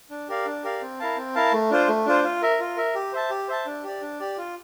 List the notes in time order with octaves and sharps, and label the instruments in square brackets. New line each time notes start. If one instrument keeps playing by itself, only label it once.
[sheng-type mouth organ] D4
G4 A#4 D5 F5
D4
G4 A#4 D5 F5
C4
E4 A#4 F5 A5
C4
E4 A#4 F5 A5
A3
D4 F4 C5
A3
D4 F4 C5
F4
A#4 E5
F4
A#4 E5
G4
C5 E5 A5
G4
C5 E5 A5
D4
G4 D5
D4
G4 D5
F4